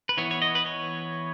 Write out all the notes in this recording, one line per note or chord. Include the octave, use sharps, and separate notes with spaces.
B4
E3 B3 C#5
C#5
D#5
B4
C#5